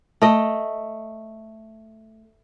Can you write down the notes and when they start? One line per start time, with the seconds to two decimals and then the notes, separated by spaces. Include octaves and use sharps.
0.22 A3 D#5